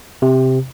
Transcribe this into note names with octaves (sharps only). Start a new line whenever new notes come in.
C3